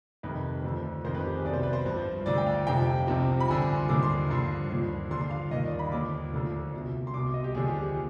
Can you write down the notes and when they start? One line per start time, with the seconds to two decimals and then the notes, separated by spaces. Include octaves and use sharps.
0.23 F2 C3 D#3 B4
0.64 D2 D3 F3
1.04 F2 D#3 C5
1.15 B4
1.24 G4
1.35 G#4
1.44 C2 B2 D5
1.54 C5
1.63 B4
1.73 C5
1.86 G2 F3
2.26 D2 D3 F3 D5
2.38 G5
2.46 F5
2.67 F2 C3 F3 G5
3.07 C2 C3 F3
3.40 B5
3.48 G2 D3 F3 G#5
3.62 G#5
3.75 C6
3.89 D#2 D3 F3 D6
4.03 C6
4.29 G2 D3 F3 C6
4.70 D#2 D3 F3
5.10 G2 D3 F3 C6
5.21 C6
5.31 F5
5.42 F5
5.51 D#2 D#3 D#5
5.65 D5
5.79 B5
5.92 D#2 D3 F3 D6
6.32 D2 D3 F3
6.74 C2 B2
7.07 C6
7.14 C2 B2 D6
7.34 D#5
7.44 G4
7.55 D#2 D3 F3 G#4
7.68 G4
7.82 G#4